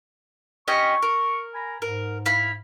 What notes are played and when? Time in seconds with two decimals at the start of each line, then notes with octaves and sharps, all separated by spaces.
0.68 C#4 G4 D#5 C#6
1.02 A#4
1.54 G#5 A#5 B5
1.82 G#2 A#4
2.26 E4 F5 B5